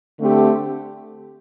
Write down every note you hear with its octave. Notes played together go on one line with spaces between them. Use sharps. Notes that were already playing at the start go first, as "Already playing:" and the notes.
D3 A3 C4 G4